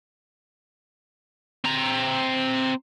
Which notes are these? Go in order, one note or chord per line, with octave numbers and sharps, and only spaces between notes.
C4 A#5